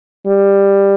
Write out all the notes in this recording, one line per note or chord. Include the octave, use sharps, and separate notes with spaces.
G3